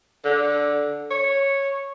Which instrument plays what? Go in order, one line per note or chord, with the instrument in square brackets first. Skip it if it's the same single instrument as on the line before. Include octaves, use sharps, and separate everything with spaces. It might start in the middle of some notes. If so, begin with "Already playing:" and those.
[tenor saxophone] D3
C#5